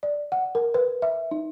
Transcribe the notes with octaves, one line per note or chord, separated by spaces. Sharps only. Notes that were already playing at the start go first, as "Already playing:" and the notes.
D5
F#5
A#4
B4
E5
D#4